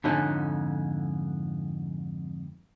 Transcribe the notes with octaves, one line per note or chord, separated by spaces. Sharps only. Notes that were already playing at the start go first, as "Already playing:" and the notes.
F2 G#2 D3 C#4 D#4